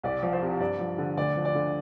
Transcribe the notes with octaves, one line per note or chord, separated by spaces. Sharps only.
C2 D5
F3
C5
C3
G2 D5
F3
D3
D2 D5
F3
D5
D3